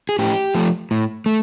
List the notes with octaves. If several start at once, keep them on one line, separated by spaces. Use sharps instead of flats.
G#4
A2 G4
F3 A3
A2
A3